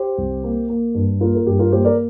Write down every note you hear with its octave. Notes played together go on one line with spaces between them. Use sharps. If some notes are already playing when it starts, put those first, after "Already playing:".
Already playing: G4 C5
C2
A#3
A#3
G2
A#3 F4 A#4
A#4
G2 G4
F4 A#4
A#3 G4 C5
A#4 D5